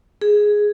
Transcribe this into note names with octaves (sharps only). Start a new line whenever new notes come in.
G#4